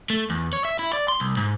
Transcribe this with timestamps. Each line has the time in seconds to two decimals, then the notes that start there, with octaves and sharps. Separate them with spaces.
0.10 A3
0.30 E2
0.53 C#5
0.65 E5
0.79 E4
0.93 D5
1.08 C6
1.20 C2
1.37 G#2